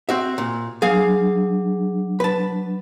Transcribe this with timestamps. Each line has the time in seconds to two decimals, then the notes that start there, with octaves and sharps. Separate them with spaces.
0.09 C4 F#4 E5
0.38 A#2
0.82 F#3 D4 G#4 F5 G#5
2.20 B4 A5